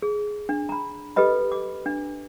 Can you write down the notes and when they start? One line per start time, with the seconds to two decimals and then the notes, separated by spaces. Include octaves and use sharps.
0.02 G#4
0.49 D4
0.69 A#5 B5
1.16 G4 A4 B4 D#5 B5
1.52 D6
1.86 D4